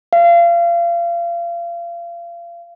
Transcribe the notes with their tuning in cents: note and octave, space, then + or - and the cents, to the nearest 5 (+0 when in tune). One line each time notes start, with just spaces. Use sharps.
F5 -30